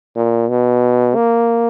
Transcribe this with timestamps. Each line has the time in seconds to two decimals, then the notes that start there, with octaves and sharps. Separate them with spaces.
0.16 A#2
0.50 B2
1.15 A#3